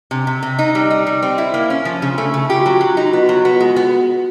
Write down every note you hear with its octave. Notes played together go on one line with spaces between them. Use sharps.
C3 D4
C3
C3
D#4
G3
D#4
G3
C4
E4
A#3
C#4
F3
C#3 D4
A3 C#4
D4
C#3 D#4
F4 G4
F#4
F#3 F4
F#3 F#4
F4
D#4 F#4
B3 F4
F#4
F#3 F4
B3 F#4
F4
G#3 F#4
B3 F4
F#4